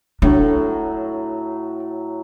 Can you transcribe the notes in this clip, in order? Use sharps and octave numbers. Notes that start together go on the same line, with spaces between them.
A2 F#3 D4